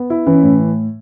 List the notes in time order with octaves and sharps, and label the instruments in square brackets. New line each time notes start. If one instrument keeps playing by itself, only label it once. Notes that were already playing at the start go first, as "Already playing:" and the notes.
Already playing: [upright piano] B3
E4
[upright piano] E3 [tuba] C#4
[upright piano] A2